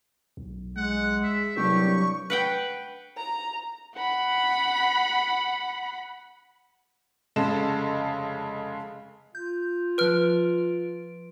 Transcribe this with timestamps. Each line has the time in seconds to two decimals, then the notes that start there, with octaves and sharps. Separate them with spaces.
0.37 B1
0.77 G#3 F#5
1.23 E5
1.57 C2 G2 F#3 D4 G4 C#6
2.30 B4 F#5 G5
3.17 A#5
3.95 F#5 B5
7.36 F1 C#3 G#3 A4 D#5 E7
9.35 F4 G6
9.98 F3 B4 F6 D7